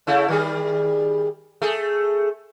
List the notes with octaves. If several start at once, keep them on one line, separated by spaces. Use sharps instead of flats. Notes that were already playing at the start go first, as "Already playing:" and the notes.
C#3 A3 E4
D#3 G3 G#4
A3 G#4